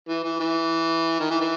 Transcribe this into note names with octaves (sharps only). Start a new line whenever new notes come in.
E3
E3
E3
D#3
E3
E3